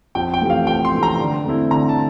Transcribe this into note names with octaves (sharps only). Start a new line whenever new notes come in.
F2 G5
G5
C3 E3 A3
F5
F2 G5
C6
C3 E3 A3
A#5
D3
A3 C4 E4
D3 A#5
A5